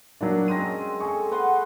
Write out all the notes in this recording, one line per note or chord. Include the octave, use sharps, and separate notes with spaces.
F#3 A#3 D4
G#3 C4 C#4 A#6 D#7
G#4 A4 G#5 C#6
B4 F#5 C6